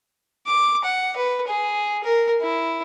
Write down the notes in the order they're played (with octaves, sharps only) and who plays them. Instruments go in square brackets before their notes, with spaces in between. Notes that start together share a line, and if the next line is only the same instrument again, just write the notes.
[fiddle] D6
F#5
B4
G#4
A#4
E4